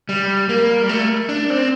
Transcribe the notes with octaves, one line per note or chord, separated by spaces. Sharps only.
G3
A#3
G3
A3
D4
C4